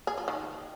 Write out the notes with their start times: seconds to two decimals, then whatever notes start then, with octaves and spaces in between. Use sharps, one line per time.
0.07 G#4
0.18 F3
0.28 D#3